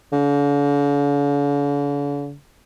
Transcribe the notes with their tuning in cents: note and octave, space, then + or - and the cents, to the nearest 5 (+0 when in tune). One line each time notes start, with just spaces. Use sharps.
D3 -45